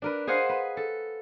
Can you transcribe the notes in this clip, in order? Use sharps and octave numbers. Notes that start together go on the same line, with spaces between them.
D4 A#4 B4
G#4 C5 D#5 F5 F#5
B4
A4